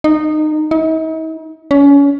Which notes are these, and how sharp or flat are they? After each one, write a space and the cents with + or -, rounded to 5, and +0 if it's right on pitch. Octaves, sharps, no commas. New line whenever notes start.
D#4 -20
D#4 +45
C#4 +30